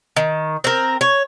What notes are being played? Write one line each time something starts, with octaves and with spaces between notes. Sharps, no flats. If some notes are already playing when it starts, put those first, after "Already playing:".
D#3
C4 A#4
C#5